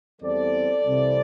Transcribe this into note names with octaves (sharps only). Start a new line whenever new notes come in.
E2 E3 G3 C4 A4 D5
C2 C3 E3 C4 E4